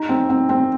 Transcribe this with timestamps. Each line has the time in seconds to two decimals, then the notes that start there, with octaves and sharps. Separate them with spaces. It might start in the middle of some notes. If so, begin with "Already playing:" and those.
Already playing: D#4
0.09 C4
0.30 C4
0.49 C4